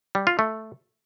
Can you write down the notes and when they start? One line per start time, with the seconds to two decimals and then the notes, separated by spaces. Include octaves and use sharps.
0.15 G3
0.27 F4
0.39 A3